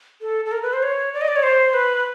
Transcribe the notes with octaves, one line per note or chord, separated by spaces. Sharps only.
A4
A4
A#4
B4
C5
C#5
D5
D#5
D5
C#5
C5
B4